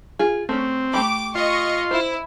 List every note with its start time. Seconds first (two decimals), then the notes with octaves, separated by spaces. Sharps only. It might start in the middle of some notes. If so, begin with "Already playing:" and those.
0.19 F4 G#4
0.49 A3 C4 C#4
0.94 A3 G4 B5 D6
1.35 F4 D#5 C6 C#6
1.91 E4 C5